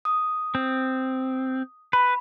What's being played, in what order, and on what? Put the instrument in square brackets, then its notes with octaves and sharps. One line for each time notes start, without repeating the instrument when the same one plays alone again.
[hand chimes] D#6
[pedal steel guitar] C4
[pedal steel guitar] B4 [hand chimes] B5